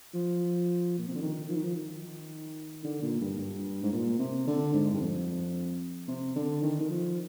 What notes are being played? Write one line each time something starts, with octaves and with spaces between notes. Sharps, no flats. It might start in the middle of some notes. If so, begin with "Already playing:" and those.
F3
A#2
C3
D3
D#3
F3
D#3
F3
D#3
D3
A#2
G2
G2
G#2
A#2
C3
D3
G#2
G2
F2
C3
D3
D#3
D#3
F3